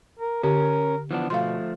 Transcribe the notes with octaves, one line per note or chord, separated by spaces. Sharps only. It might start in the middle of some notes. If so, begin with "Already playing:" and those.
A#4
D3 C#4 G4 A#4
E3 F3 B3 D4
B2 F3 A3 F5 C6